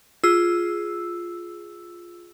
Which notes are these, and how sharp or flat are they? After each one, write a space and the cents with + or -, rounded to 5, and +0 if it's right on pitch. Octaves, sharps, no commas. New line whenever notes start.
F4 +0 G#4 +0 E6 +0